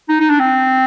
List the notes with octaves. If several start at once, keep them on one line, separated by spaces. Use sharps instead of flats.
D#4
D#4
D4
C4